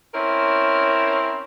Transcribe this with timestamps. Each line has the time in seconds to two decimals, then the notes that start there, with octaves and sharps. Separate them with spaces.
0.14 C4 C#4 E4 A#4